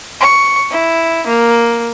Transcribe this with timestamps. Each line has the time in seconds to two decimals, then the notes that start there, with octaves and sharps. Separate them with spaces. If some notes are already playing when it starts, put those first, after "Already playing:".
0.21 C#6
0.72 E4
1.27 A#3